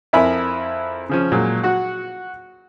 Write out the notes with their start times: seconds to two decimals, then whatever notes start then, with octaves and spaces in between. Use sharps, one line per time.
0.13 F2 E4 A#4 E5 G#5 B5
1.09 C#3 F3 C#4
1.32 A#2 F#3 G#3
1.63 F#4 F#5